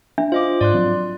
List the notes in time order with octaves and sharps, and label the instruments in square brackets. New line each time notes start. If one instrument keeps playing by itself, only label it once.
[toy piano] D4 E5
[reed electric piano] F4 [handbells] C5 D#5 D6
[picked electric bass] G#2 [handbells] D5 C6 F#6
[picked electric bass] F3 F#3 C4